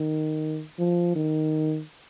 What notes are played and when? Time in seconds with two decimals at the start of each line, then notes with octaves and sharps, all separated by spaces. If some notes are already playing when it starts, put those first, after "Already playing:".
Already playing: D#3
0.79 F3
1.16 D#3